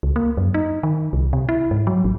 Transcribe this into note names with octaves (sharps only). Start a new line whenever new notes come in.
C#2
A#3
F#2
D#4
D#3
C2
C3
E4
G#2
F#3
A1